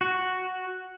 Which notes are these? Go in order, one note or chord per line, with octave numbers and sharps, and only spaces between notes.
F#4